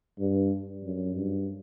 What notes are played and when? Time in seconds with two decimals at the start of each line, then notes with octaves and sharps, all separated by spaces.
0.19 G2
0.84 F#2
1.16 G2